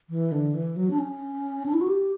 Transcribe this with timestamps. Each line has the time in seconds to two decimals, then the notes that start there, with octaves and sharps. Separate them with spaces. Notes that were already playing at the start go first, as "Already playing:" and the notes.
0.10 E3
0.32 D3
0.54 E3
0.76 F#3
0.91 D4
0.99 C#4
1.66 D4
1.74 E4
1.81 F#4
1.88 G4